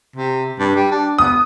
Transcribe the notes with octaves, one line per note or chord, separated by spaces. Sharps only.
C3
G2
G3
D4
B3 D#6